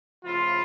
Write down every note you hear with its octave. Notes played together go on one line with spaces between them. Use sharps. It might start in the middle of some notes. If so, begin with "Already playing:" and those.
C#3 F3 A3 E4 F4